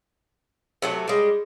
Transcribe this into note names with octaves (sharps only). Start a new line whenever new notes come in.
C3 F#3 A3
G3 G#3